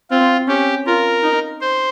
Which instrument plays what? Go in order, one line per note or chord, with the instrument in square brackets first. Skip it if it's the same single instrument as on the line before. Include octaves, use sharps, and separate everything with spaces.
[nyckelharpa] C4 [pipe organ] F4
[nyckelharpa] C#4 [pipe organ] G4
[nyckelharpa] F4 [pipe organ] A#4
[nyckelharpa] D#4
[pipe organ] C5